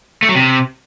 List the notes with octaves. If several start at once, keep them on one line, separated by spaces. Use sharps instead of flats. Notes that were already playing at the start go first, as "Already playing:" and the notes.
A3
F#3
C3